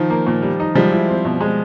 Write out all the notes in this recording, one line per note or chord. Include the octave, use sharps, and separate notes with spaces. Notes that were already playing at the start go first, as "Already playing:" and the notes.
Already playing: D#3 F3
A#3
A#2
G3
D#4
F3 G3 G#3
E4
C4
B2
G#3